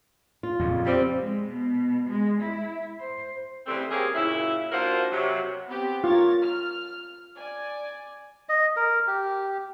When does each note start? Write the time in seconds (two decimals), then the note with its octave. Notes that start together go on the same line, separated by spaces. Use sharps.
0.43 F4
0.59 F2 A#2 C#3
0.85 G3 C4
1.19 G#3
1.49 B2
2.09 G#3
2.41 E4
3.00 C5
3.67 C#3 E3 G3 A3 C4
3.90 A#3 C4 C#4 G4 G#4 A#4
4.15 F#2 A#2 C#3 E4
4.71 A#3 D4 F4 F#4 A#4 C5
5.12 C3 F#3
5.68 B3 C4 G4
6.04 F4 A#4 C#5 A6
6.43 F6
7.38 D5 G#5
8.49 D#5
8.76 A#4
9.07 G4